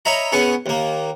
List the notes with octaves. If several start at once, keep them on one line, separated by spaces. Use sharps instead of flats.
C#5 D#5 E5 A#5 B5
B3 C#4 G#4 C#6
D#2 A#3